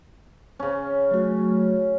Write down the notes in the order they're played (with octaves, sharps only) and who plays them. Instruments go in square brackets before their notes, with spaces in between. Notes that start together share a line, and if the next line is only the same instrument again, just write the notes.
[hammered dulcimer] C#3 C#4
[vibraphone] F#3 A3 F#4